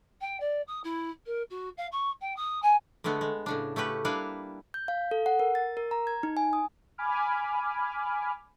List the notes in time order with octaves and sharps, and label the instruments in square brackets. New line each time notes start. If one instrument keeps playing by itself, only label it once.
[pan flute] G5
D5
D#6
E4
A#4
F#4
F5
C#6
G5
D#6
G#5
[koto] D3 G#3 A3 B3
G#3
A2 C#3 D4
A3 C#4 G4 B4
G3 A#3 D4 E4 B4 F5
[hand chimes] G6
F5
A4
F#5
A#4
A6
A#4
A#5
G#6
D#4
G#5
D#6
[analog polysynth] G#5 B5 D6 F6